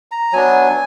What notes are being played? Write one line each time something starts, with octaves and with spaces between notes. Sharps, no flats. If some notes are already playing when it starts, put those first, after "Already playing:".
A#5
F#3 B3 D4 G#5